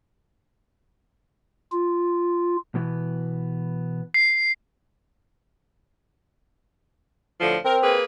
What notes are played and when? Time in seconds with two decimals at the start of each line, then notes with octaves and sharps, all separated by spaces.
1.72 F4
2.75 B2 E3 B3
4.14 C7
7.40 A2 D3 F3
7.65 C4 A#4
7.82 A#3 G#4 B4